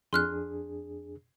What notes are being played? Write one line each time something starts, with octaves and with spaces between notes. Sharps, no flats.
F2 D4 G#4 C6 F6 F#6